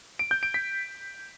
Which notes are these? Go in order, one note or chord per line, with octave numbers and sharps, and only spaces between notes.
D7
G6
D7
B6